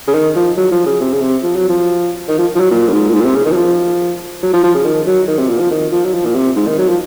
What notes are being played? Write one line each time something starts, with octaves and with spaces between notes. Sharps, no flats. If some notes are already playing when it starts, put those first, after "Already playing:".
C#3
D#3
F3
F#3
F3
C#3
C3
C#3
C3
F3
F#3
F3
D#3
F3
F3
F#3
A#2
F#2
G#2
A#2
G#2
A#2
C3
C#3
D#3
F#3
F3
F#3
F3
F3
C#3
D#3
F#3
D#3
C3
A#2
F3
D#3
F3
F#3
F3
A#2
C3
G#2
D#3
F#3
F3